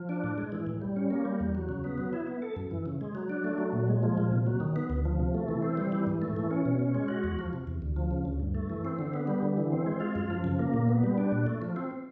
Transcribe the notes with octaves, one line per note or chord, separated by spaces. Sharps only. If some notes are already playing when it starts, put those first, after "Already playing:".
Already playing: F3
D4
A2
G#3
E3
A2
G3
C#4
A#3
G3
E2
F#3
C#3
B3
F#3
E4
B3
A4
F#2
E3
C#3
G#3
F#3
D4
A3
F#3
A#2
G#3
F3
A#2
C3
F#3
D#3
B3
D2
F3
C3
A3
E3
C4
G3
E3
G#2
A3
E3
C#4
B2
C#4
G#3
F#4
E2
F3
C3
E2
D2
F3
C#3
D2
G2
A3
E3
C4
D3
B3
G3
D3
E3
C4
G#3
F4
F#2
F3
C#3
A#3
A#2
B3
G3
D4
A#2
A3
F3
C4